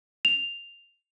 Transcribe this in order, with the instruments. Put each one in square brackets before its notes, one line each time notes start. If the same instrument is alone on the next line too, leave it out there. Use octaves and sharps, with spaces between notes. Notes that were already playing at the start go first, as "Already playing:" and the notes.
[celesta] F7